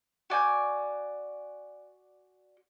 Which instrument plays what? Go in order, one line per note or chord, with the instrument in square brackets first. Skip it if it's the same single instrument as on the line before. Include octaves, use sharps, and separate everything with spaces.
[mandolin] F#4 D5 G#5 G6